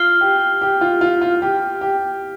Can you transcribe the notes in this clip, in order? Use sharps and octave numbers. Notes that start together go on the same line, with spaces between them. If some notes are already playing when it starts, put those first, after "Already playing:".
Already playing: F4 F6 C7 G7
G4
G4
F4
F4
F4
G4
G4